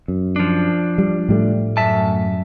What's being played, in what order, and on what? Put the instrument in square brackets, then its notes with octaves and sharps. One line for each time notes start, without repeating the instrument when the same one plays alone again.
[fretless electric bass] F#2
[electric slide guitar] F3 D4
[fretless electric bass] G3
A2 G3 A3
[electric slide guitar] F#2 E5 A5